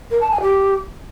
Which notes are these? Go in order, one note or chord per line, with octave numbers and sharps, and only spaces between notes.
A#4
A5
G#5
G4